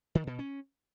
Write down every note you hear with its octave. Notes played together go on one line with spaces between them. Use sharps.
D#3
B2
C#4